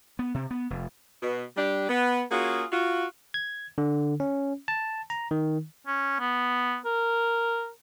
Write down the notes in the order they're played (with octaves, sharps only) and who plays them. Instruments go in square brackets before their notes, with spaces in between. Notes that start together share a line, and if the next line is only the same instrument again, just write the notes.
[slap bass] B3
C3
B3
F1
[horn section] B2
G3 D4 G4
B3
A#3 C#4 F4 F#4 G#4
F4 F#4
[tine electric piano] G#6
D3
C#4
A5
A#5
D#3
[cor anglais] C#4
B3
A#4